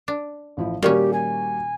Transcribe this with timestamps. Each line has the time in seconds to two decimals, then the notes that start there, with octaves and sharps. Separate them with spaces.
0.08 D4
0.57 A1 F3 E4
0.83 A#2 D#3 G3 A#3 C#4 F#4 G4
1.13 G#5